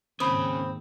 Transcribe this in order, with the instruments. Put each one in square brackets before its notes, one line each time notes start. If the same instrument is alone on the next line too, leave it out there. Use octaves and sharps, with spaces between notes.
[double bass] D#2 G#2 [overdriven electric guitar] C#3 [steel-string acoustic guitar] C4 [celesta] B5 D#6